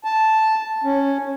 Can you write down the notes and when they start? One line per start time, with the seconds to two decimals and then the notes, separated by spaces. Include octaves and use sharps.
0.04 A5
0.84 C#4